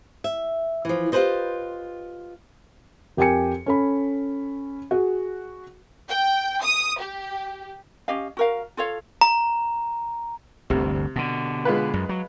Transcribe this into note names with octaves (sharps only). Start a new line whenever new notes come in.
E5
E3 F3
F4 G4 G#4 B4 C5 D#5
F2 G4 A#4 G5 G#5 C#7
C#4 A4 B5
F#4 G#4
G5
D#6
G4
C#4 G4 D#5 F5
F#4 A#4 F5
F4 A4 C#5 F5
A#5
G1 D2 C3
B2 D3
G#3 F4 B4
F#2
F#3